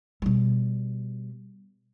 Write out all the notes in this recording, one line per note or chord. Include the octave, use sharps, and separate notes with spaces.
B2 G3